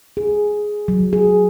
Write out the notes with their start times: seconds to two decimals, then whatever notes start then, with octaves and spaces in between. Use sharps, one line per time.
0.17 G#4
0.88 F#3
1.13 G#4